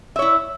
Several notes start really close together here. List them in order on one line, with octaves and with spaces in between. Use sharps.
E5 C#5 E4